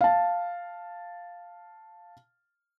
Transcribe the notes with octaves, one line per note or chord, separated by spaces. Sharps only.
F5 A5